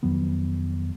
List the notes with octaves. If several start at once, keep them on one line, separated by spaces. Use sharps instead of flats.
F2 D#3 F#3 B3